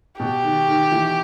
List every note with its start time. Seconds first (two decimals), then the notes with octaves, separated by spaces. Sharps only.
0.20 B2 G4
0.43 D#3
0.68 D#3
0.92 E3